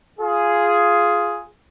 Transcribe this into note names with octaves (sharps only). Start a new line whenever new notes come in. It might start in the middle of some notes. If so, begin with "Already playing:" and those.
F4 G#4